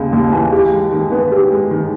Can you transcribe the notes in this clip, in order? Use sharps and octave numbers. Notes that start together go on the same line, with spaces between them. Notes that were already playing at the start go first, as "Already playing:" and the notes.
Already playing: D#2 C#3
D#2
E3
G4
G#3
D#3
B3
G4
G#3
D#3